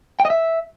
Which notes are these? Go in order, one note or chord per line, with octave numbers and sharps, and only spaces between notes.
G5
D#5
E5